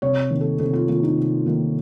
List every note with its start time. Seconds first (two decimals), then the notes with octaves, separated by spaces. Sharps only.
0.02 C3 C#5
0.31 D#3 A#3
0.41 A4
0.59 C3 A4
0.73 F4
0.88 D#3 A#3 F4
1.03 D#4
1.17 C3
1.46 D#3 A#3